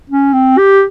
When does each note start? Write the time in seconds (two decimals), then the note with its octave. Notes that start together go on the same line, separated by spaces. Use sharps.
0.10 C#4
0.33 C4
0.58 G4